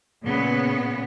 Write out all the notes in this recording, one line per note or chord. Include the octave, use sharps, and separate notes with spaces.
A#2 C#3 B3